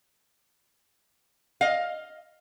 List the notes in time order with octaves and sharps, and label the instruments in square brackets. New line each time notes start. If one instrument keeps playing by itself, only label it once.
[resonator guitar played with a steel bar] D#5 F5